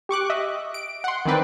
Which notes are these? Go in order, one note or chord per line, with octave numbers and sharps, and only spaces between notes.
G4 C#6 D6 F#6
D#5 E5
D7
F#5 C6
D#3 E3 C4 B4 D5